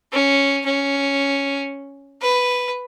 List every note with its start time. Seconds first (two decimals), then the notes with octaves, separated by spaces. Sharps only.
0.13 C#4
0.65 C#4
2.22 B4